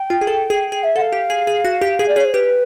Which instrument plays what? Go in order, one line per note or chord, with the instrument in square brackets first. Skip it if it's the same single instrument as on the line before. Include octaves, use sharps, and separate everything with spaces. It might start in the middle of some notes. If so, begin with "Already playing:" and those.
Already playing: [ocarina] G5
[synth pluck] F4
G#4
A4
G#4
G#4
[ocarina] E5
[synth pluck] A4 [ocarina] F#5
[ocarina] F5
[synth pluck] G4
G#4
G#4
F#4
G4
G#4
[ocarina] D5
[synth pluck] G#4 [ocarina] C#5
[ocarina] C5
[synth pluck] G4 [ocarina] B4